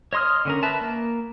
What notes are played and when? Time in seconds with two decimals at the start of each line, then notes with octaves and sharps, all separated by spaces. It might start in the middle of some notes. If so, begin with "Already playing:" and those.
0.13 C#5 D#5 C6 D#6 F6
0.45 D3 C#4 A#4
0.63 B4 E5 A5
0.81 A#3